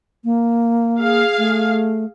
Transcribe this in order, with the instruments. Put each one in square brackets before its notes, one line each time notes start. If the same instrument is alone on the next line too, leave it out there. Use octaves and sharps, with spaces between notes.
[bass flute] A#3
[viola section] G#4 F5
[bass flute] A3